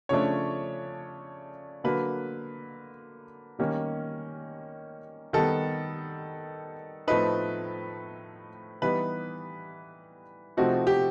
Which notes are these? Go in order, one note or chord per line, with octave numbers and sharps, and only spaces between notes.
C#3 F3 A3 D4 C#5
D3 F#3 A#3 B4
D#3 G3 A#3 C#4
D#3 G3 B3 A4
A2 F3 A3 C4 D#4 B4
E3 G3 B3 D#4 B4
C3 F3 A3 C4 D#4 F#4
G4